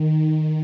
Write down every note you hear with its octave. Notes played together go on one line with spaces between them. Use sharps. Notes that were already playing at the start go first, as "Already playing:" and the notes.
Already playing: D#3